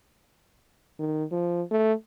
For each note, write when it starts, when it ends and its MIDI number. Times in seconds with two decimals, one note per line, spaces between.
0.99 1.24 51
1.32 1.62 53
1.71 1.93 57